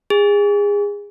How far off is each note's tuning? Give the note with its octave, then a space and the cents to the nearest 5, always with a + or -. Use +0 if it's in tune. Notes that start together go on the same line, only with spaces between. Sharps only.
G#4 -25